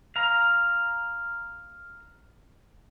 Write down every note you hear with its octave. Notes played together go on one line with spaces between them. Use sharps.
F5 A#5